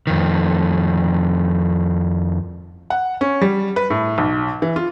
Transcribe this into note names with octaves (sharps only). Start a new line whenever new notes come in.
F2 D#3
F#5
C#4
G3
B4
A2
B1
E3
F4